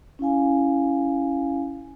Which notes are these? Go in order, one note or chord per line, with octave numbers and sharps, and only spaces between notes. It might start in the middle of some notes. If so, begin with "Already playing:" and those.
C#4 E4 F5 G#5